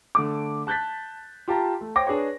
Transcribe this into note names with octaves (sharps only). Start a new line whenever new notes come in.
D3 A3 D6
A5 F#6 G6 A6 B6
F4 G4 A5 A#5
A3
C5 C#5 G5 D6 A#6
D4 G#4 B4 C#5